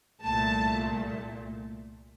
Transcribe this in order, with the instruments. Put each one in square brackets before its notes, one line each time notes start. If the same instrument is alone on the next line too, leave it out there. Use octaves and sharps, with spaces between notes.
[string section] C2 A#2 A3 A5